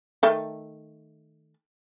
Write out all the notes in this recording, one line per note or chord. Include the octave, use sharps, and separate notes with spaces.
D#3 A3